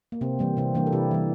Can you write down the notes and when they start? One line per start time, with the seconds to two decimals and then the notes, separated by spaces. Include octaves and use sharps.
0.12 A#3
0.21 C3 C4
0.39 E3 G3 A#3
0.57 C3 C4
0.75 E3 G3 A#3 D4
0.87 A4
0.92 C3 E4 G4
1.11 E3 G3